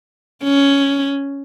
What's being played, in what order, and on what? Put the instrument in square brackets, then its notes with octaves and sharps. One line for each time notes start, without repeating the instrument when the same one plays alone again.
[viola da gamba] C#4